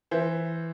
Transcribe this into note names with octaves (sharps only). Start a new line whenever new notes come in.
E3 C5 E5